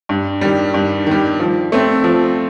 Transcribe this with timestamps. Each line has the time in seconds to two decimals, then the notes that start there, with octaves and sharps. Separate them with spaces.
0.09 G2
0.41 D#3 G3
0.74 G2
1.07 D#3 G3
1.40 F3
1.72 A3 C4
2.04 F3